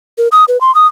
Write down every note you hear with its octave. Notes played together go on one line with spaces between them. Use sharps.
A#4
D#6
B4
C6
D#6